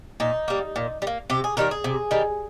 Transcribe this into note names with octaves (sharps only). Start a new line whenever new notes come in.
A#2 D#4
G3 A#3
A#2
G3
A#3
C3 G4
G#4
D#3 G3 A#3 A#4
G#4
C3
D#3 G3 A#3